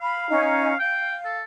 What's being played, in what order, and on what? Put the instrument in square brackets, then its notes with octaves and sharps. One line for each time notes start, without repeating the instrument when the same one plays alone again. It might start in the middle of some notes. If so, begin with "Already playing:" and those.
[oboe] F5 [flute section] B5
[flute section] C#4 D#4
[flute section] F5 [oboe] G5
[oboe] A4